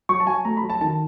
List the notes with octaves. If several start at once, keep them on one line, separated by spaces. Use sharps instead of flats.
F#3 C#6
A5
F#3 G#5
A3 A#5
B5
F#3
A5
D#3 A5